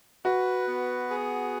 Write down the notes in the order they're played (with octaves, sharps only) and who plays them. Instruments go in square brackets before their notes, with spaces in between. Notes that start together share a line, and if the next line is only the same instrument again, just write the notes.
[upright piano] F#4 [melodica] B4
[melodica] B3
G#4